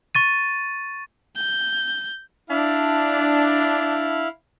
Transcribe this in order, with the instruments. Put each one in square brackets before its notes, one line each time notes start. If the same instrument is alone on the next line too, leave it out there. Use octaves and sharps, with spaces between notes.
[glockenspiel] C#6 A6 D#7
[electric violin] G6
[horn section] D4 [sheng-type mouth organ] E4 F5